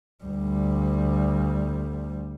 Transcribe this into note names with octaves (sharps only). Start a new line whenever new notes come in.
D2 G3